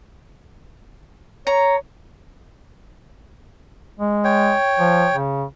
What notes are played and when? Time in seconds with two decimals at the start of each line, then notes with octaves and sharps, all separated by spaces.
1.47 C#5 A#5
4.00 G#3
4.24 C#5 G5
4.79 F3
5.12 C#3